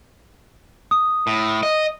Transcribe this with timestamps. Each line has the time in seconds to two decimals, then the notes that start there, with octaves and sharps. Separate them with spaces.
0.91 D#6
1.27 A2
1.63 D#5